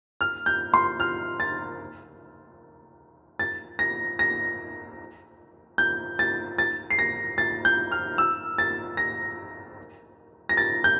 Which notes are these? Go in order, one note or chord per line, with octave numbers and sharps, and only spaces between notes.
F6
G6
C6
F6
A6
A6
A#6
A#6
G6
A6
A6
C7
A#6
A6
G6
F6
E6
A6
A#6
A#6
A6
G6